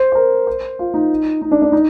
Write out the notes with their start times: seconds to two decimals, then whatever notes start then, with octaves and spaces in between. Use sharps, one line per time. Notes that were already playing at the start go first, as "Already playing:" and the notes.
Already playing: C5
0.12 C5
0.15 A#4
0.47 C5
0.79 F4
0.94 D#4
1.42 D#4
1.52 D4
1.62 D4
1.72 D#4